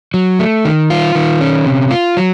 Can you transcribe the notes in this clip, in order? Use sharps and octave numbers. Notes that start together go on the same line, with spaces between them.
F#3
A3
D#3
F4
D#3
C#4
C3
F4
F#3